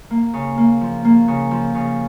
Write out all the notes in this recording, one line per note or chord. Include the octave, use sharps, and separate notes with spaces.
A#3
C#3
A#3
F3
A#3
C#3
F3
C#3